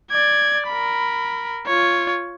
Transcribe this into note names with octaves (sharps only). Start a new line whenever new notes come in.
D5 G#6
A#4 B5
F4 C#5